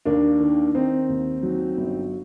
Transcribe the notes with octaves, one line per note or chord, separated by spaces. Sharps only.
D#2 A#3 D4
D#3
D#3 C4 D#4
D#2
F#3
G1